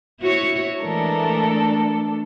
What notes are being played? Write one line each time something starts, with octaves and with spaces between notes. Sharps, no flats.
E4 F#4 C#5
E3 G#3 A3 D4 A4 A#4